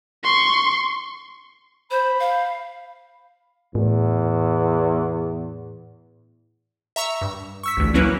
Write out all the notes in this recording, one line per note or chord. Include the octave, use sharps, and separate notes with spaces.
C6 C#6
C5 B5
F5
E2 A2
E5 A#5 C#6 E6
G2
C#6 E6 B6
A1 D2
F#3 A#3 C#4 E4 B4